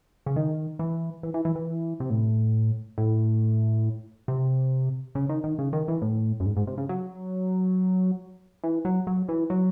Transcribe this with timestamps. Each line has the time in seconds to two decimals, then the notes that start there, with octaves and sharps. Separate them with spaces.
0.26 C#3
0.36 D#3
0.79 E3
1.23 E3
1.34 E3
1.45 E3
1.56 E3
2.00 C3
2.10 A2
2.98 A2
4.28 C3
5.15 C#3
5.29 D#3
5.44 D#3
5.59 C#3
5.73 D#3
5.88 E3
6.02 A2
6.40 F#2
6.46 G#2
6.57 G#2
6.67 C3
6.78 C#3
6.89 F#3
8.64 E3
8.85 F#3
9.07 F#3
9.29 E3
9.50 F#3